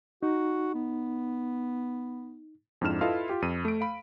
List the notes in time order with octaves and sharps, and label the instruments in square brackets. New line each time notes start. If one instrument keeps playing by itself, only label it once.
[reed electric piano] D#4 [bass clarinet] F#4
[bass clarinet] B3
[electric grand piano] F2 G#2 D4 E4 F6 E7
E4 F4 A4 B4 D#5 F5
F4 G4
F2 D#7
A3 D7
F5 B5